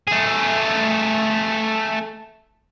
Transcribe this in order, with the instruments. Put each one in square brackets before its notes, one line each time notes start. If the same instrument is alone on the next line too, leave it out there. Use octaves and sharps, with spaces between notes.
[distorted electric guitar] A3 G#4